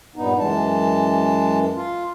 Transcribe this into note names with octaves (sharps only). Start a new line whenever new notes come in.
G2 A#2 B3 D#4
F#2 E3 G#3 A5
F4